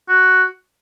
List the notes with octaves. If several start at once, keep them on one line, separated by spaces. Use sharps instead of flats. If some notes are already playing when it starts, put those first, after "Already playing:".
F#4